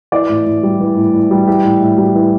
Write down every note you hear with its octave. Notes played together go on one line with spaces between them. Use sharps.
E3 D5
A2
A2
G3
E3
A2
A2
G3
E3 G4
A2
A2
G3
E3